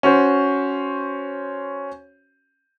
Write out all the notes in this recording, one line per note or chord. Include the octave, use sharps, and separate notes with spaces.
C#4 F#4 C5